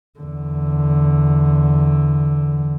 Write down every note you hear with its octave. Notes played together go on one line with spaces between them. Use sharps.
E2 D3